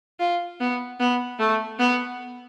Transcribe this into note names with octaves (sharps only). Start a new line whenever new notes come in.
F4
B3
B3
A3
B3